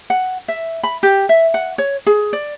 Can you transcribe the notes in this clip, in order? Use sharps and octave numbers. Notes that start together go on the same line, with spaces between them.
F#5
E5
B5
G4
E5
F#5
C#5
G#4
D5